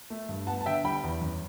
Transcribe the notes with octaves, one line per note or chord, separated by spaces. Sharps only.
A3
G2
B3 F#5 A5
A5
D3 E5 G5
G3 G5 B5
E2
F#2